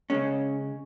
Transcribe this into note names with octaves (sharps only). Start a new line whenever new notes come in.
C#3 G#3 C#4